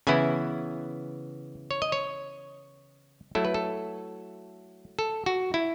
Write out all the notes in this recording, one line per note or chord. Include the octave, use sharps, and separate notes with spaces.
C#3 E3 B3 E4 G#5
C#5
D#5
C#5
F#3 A3 E4 A4
B4
A4
A4
F#4
E4